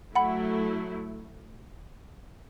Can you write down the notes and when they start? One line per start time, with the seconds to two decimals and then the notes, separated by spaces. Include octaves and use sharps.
0.15 F#3 A3 E4 F#5 B5